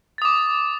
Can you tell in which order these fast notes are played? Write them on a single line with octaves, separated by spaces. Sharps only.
A6 D#6 D6